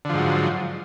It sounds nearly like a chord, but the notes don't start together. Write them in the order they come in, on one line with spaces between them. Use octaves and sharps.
D3 F3 G#2 F#3